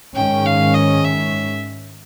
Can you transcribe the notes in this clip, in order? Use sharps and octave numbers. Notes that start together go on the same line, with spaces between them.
G#2 D#3 G#3 C#4 G5
F5
D#5
E5